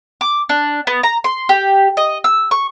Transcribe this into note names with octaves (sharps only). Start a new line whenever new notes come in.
D6
D4
B3
A#5
C6
G4
D#5
E6
C#6